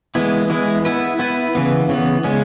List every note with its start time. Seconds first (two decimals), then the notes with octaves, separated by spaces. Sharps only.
0.15 E3 G#3 B3 E4
0.50 E3 G#3 B3 E4
0.85 B3 E4 B4
1.19 B3 E4 B4
1.55 C#3 E3 B3
1.89 C#3 E3 B3
2.24 C#3 G#3 C#4